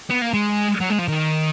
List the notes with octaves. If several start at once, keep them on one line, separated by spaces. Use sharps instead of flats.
B3
A#3
G#3
F#3
G#3
F3
D#3